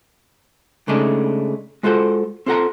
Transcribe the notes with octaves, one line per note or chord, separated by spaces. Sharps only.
C#3 G#3 A3 D4 D#4
G#3 F4 F#4 A4 C5
C4 F4 A4 C#5 F#5 A#5